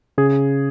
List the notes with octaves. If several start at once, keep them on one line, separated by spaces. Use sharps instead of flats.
C#3 G#4